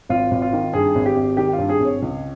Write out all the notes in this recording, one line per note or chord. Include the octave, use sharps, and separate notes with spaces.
G#1 F4
G#1
F4
D#3
G2 G#4
G#1
G4
G#1
D#3 G4
F4
G2
G#4
G#1 C#5
C#2